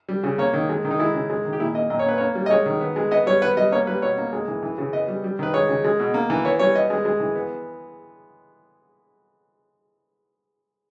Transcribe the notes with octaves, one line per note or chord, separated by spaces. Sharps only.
G3
C#3
A#3 C#5
D#3
G#3
D#3
D#4
G#3 E4
C#3
G#3
D#3
G4
A#2 E4
A#3 D#5
A#2 D#5
C#5
A#3 B4
A#3 C#5
G3
D#5
G#3 C#5
D#3
B3
G#3
B3 D#5
G3 C#5
B3 B4
G3 D#5
A#3 C#5
G3 B4
B2 C#5
A#3
G#3
E3
E3
C#3
B3 D#5
G3
G3
D#3 B4
G#3 C#5
C#3
G#3
B2
A#3
E3
B3 C#5
G3 C#5
B3 D#5
G#3
G#3
E3
B3